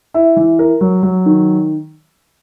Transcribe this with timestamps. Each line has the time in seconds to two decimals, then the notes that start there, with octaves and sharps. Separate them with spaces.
0.14 E4
0.36 E3
0.59 A#4
0.81 F#3
1.03 F#3
1.26 D#3